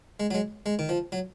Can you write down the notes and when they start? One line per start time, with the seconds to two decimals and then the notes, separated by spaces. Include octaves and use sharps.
0.20 G#3
0.31 F#3
0.34 G#3
0.66 G#3
0.79 D#3
0.89 F3
1.12 F#3